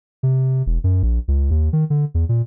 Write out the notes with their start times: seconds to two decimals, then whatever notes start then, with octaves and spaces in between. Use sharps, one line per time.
0.23 C3
0.66 E1
0.84 F#2
1.03 A#1
1.28 C#2
1.51 D#2
1.73 D#3
1.90 D3
2.14 E2
2.29 A#2